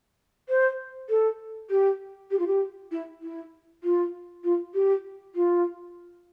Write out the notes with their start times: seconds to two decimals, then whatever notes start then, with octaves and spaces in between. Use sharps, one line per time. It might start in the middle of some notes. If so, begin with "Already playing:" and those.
0.49 C5
1.09 A4
1.70 G4
2.31 G4
2.39 F4
2.47 G4
2.91 E4
3.22 E4
3.83 F4
4.44 F4
4.74 G4
5.35 F4